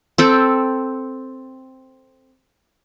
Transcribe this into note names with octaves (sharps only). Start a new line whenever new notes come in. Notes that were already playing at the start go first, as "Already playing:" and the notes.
C4 A4 G5